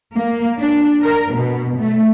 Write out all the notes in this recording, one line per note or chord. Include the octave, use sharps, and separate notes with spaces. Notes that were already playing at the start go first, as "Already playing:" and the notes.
A#3
D4
A#4
B2
A3